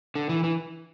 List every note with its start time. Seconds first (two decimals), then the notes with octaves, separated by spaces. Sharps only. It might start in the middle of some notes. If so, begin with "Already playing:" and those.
0.15 D3
0.29 E3
0.44 E3